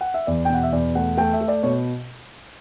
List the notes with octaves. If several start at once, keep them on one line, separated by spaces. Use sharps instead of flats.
F#5
E5
E2 D5
G5
B2 F#5
E5
E2 D5
A3 F#5
A3 G5
E5
A3
D5
B2 C#5